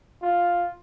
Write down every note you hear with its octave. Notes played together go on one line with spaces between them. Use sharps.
F4